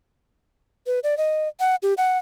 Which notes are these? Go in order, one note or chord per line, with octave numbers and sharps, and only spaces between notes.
B4
D5
D#5
F#5
G4
F#5